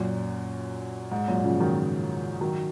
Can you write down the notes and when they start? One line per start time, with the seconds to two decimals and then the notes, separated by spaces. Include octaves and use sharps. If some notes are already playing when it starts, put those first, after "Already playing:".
Already playing: F#2 A#2
1.11 G#2
1.28 F#2 A#2
1.44 C#3 F3
1.60 D#3 F#3
2.41 D#3 F#3